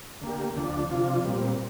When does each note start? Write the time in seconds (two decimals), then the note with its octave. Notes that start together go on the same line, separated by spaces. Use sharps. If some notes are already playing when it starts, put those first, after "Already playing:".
0.22 D3 A#3 G4
0.56 D2 D3 F3 D4
0.90 C3 F3 D4 F4
1.25 A#2 G3 C4